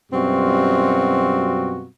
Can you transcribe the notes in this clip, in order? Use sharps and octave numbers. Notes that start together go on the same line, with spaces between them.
F#2 B2 G3 C4 F4 F#4